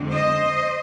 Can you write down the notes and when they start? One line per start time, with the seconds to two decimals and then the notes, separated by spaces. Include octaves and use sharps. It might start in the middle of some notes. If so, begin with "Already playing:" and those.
Already playing: F2 D3 G#3 C4
0.12 C5 D#5